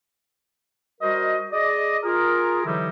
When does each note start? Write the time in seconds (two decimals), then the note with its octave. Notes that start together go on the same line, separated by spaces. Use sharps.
1.01 G3 F#4 A#4 C5 D#5
1.52 G#4 D5 D#5
2.04 F4 G#4 A#4
2.65 D3 E3 F#3 G3 D#4 E4